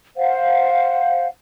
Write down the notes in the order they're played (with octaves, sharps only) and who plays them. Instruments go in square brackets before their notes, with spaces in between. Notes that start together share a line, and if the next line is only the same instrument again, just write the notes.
[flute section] C5 F5 F#5